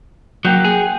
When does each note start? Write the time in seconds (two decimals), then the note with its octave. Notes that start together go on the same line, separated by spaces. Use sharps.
0.45 F#3 A#3 F#5 G5
0.65 G#4